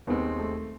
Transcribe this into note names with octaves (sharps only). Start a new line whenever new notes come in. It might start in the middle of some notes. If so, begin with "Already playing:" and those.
D#2 D#3 G#3 B3 C4
A3